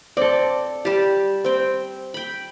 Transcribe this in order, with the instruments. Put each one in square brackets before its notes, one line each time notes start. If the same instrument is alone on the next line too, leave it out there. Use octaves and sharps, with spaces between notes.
[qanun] C4 [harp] A4 D5
[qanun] G3 G4 [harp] A6 E7
[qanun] C4 G5
G5 B5